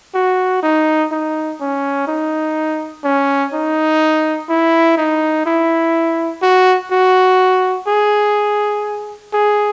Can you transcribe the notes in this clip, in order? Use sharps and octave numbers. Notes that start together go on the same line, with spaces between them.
F#4
D#4
D#4
C#4
D#4
C#4
D#4
E4
D#4
E4
F#4
F#4
G#4
G#4